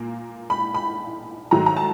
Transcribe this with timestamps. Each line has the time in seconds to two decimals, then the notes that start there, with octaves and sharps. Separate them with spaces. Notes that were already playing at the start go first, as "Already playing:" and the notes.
Already playing: A#2 A#3
0.50 B5
0.74 B5
1.51 G#2 D#3 F#3 A3 A#5
1.66 A#5
1.76 A5